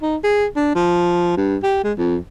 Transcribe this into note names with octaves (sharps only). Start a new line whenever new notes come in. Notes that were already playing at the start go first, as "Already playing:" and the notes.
D#4
G#4
D4
F3
G2
G4
G#3
F2